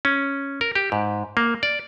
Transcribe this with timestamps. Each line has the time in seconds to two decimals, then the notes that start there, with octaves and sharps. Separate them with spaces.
0.05 C#4
0.61 A#4
0.75 G4
0.92 G#2
1.37 A#3
1.63 D5